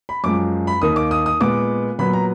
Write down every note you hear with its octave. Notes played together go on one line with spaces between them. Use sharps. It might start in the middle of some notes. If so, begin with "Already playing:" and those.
B5
F#2 F3 G#3 D6
B5
D#2 D#3 A#3 D#6
D6
D#6
D#6
A#2 G#3 B3 D6
A#2 F#3 B3 B5
A#5